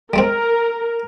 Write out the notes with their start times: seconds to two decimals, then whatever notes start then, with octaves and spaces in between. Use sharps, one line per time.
0.13 G3 G#3 C4 A#4